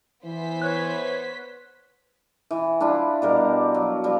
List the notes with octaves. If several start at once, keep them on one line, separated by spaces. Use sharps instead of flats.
E3 B3 C5 B6
B4 C#5 F#6
E3
D4 E4 F4 B5
B2 G3 A#4
F#3
F3 G3